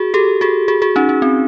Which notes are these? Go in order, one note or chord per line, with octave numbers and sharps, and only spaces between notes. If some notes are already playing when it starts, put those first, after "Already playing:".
Already playing: F#4 G#4
G4 A4
F#4 G#4
F#4 G#4
F#4 G#4
C#4 D#4
C#4
C4